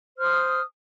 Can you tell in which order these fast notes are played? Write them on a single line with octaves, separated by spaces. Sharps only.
C5 F6 D#6